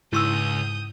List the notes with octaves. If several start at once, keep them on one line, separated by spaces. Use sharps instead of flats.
C#2 G#2 E4 C#6 D#6 E6 G6